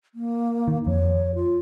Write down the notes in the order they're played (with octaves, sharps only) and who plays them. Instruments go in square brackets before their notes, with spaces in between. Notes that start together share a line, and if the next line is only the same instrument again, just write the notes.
[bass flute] A#3
[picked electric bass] D#3
[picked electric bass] F2 [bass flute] C#5
[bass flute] F4